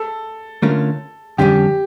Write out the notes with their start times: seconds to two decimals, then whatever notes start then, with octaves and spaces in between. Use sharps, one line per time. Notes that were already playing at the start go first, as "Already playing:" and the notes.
Already playing: A4
0.62 D3 A3 C#4 F4 A#4
1.38 F2 D3 G3 C#4 G4